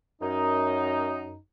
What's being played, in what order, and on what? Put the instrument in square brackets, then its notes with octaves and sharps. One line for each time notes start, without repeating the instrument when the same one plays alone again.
[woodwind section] F#2 D#4